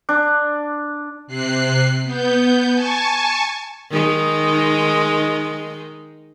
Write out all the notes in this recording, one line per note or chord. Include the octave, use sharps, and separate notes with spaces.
D4
C3 F#6 C7
B3 G6
G#5 A5 C#6
D#3 G#3 D#4